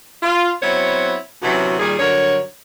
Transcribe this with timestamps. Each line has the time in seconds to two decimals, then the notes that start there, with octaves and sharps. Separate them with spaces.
0.23 F4
0.62 F#3 B3 C4 E4 C5 C#5
1.43 D2 C3 E3 F#3 C#4 F#4
1.78 A#2 D#3 G3 G#4
1.99 G2 D3 F#3 A#4 C#5